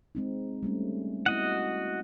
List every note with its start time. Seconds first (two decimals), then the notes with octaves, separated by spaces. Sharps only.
0.15 G#3 C4 D#4
0.63 G3 A3 C#4
1.26 B3 E4 F#4 D#5 F#5